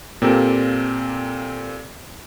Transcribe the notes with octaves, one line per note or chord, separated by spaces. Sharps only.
A#2 C4 G4 A4 A#4